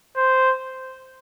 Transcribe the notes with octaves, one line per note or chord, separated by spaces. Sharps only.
C5